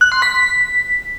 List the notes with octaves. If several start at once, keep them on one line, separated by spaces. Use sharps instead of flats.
F#6
C6
B6